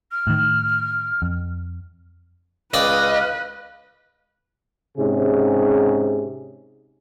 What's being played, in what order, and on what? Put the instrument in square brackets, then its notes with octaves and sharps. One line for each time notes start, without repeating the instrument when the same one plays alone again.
[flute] F6
[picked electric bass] A2 D#3
F2
[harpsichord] C#2 D5 G5 [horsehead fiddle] B4 [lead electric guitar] D#5 [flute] F5
[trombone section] G#2 C3 C#4 G#4